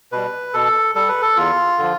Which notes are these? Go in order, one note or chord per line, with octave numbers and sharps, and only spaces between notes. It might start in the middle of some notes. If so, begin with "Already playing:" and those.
B2 G3 B4
B2 A4
G3 A4
B4
A4
E2 F4
D3 F3